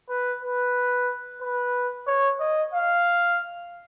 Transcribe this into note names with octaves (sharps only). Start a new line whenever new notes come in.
B4
B4
B4
C#5
D#5
F5